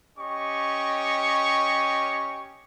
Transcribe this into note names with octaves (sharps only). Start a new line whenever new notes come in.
C#4 G4 D#5 C#6